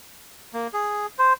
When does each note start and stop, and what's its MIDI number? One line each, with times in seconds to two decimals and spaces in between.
0.54 0.67 58
0.74 1.06 68
1.18 1.33 72